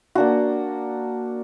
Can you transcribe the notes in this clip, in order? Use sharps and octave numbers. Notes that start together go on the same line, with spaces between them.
A#3 D4 F#4